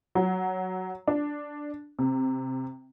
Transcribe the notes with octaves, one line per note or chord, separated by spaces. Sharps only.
F#3
D4
C3